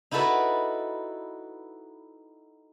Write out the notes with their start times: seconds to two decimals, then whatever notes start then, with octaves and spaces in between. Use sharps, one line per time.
0.11 D#4 E4 F#4 A4 B4 D5